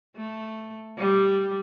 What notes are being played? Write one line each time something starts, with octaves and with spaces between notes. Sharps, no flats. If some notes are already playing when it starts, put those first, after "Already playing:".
A3
G3